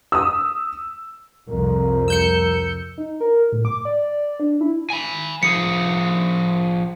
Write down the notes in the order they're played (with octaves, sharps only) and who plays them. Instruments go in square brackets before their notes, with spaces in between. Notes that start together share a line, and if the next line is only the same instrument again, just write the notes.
[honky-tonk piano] D#6 E6
[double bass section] C2 F2 [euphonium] A#4
[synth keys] E6 G6 C#7
[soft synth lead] D#4
A#4
A2
D6
D5
D4
E4
[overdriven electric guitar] G#5 B5
[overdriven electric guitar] F3 G#4 [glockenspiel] C#7